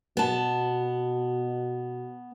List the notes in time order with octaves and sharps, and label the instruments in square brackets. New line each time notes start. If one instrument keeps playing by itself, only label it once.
[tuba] B2 [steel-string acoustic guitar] B3 A5